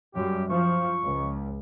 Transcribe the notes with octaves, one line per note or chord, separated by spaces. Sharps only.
F#2 G3 G4
F3 C#6
C#2